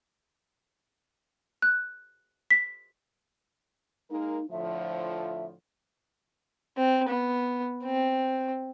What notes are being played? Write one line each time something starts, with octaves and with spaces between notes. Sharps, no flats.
F#6
B6
G#3 A#3 D#4 A#4
A2 D3 F3 E5
C4
B3
C4